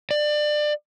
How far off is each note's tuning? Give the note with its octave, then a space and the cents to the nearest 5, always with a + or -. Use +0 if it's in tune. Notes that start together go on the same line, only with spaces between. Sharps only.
D5 +25